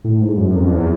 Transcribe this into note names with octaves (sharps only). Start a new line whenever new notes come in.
A2
G#2
F#2
F2
E2